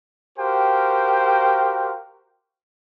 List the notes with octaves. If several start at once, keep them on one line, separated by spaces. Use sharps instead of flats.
F#4 G4 A#4 C5 F5 G5